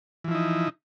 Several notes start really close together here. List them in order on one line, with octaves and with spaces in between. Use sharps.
E3 F3 E4 D#4